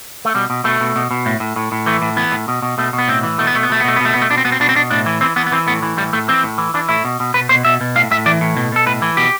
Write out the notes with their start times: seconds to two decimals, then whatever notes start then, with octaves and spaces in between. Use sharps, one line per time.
0.25 A3
0.35 B2 G3
0.50 B2
0.64 B2 A3
0.81 B2
0.96 B2
1.11 B2
1.26 A2
1.40 A2
1.56 A2
1.72 A2
1.86 E3 A3
2.02 A2
2.17 E3 B3
2.32 A2
2.48 B2
2.62 B2
2.78 B2 A3
2.93 B2
2.98 B3
3.08 A2 C4
3.23 E3
3.38 B2 A3
3.47 B3
3.53 B2 A3
3.63 B3
3.69 B2 A3
3.80 B3
3.84 B2 A3
3.96 B3
4.00 B2 A3
4.14 B2 B3
4.22 A3
4.30 B2 D4
4.37 C4
4.45 B2 B3
4.52 C4
4.60 B2 D4
4.69 C4
4.76 B2 D4
4.90 A2 D4
5.06 E3
5.21 E3 C4
5.36 E3 B3
5.46 B3
5.52 E3 C4
5.67 A2 B3
5.83 E3
5.97 A2 G3
6.13 A2 A3
6.28 E3 C4
6.43 A2
6.58 E3
6.74 E3 D4
6.89 A2 E4
7.05 B2
7.20 B2
7.34 B2 B4
7.49 B2 C5
7.65 B2 E5
7.81 B2
7.96 A2 F5
8.11 A2 E5
8.26 E3 D5
8.41 A2
8.57 B2
8.72 B2 A4
8.86 A2 B4
9.02 E3
9.17 B2 G4